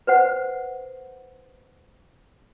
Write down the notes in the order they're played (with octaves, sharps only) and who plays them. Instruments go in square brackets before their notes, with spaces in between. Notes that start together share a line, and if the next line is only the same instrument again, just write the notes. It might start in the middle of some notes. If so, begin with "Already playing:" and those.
[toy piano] B4 C5 F#5